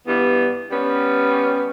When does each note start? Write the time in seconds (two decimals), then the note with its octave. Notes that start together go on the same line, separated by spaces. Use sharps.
0.07 G2 E3 G3 B3
0.71 G3 B3 C#4